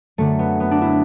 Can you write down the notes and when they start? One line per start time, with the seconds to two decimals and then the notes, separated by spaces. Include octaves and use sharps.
0.18 F#2 D3 A3
0.39 B3
0.60 B3
0.71 D4
0.82 E4